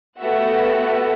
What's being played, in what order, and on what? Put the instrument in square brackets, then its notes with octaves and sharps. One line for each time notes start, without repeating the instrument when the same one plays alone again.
[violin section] A3 B3 F#4 G4 E5 F#5